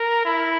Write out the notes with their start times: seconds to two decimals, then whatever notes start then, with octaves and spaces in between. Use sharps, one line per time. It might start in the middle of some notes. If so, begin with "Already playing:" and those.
Already playing: A#4
0.25 E4